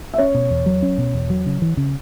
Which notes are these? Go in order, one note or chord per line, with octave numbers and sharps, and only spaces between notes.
E5
C#4 C#5
B2
E2
F#3
C#4
B2
E2
F#3
C#3
E3
C#3